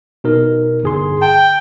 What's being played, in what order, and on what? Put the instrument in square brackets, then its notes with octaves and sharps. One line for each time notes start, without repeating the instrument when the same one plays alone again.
[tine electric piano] B2 D#4 A#4
G1 G#4 C6
[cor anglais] G5 [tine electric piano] A5